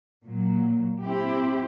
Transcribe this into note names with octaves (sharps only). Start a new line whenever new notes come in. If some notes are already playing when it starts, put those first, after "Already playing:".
A#2 F#3
C4 E4 G4